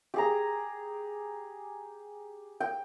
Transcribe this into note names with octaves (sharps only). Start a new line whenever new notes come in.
G4 G#4 A#5
G5